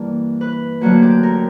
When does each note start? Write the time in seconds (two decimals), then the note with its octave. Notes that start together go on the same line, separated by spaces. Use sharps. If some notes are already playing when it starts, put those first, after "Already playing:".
Already playing: G2 E3 G3 A#3
0.41 B4
0.81 D2 D3 F#3 A#3 F#4
1.02 G4
1.23 A#4